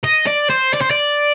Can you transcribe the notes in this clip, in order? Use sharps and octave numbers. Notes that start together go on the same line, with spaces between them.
D#5
D5
C5
D5
C5
D5